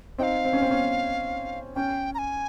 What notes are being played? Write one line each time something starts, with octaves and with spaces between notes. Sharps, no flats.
C4 D#4 F5 G5
C4
C#4
C4
C#4
C#4 G5
A#5
G#5